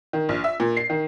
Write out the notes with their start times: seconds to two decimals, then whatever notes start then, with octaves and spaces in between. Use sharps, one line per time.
0.13 D#3
0.29 A#1
0.44 E5
0.60 A#2
0.77 C7
0.90 D#3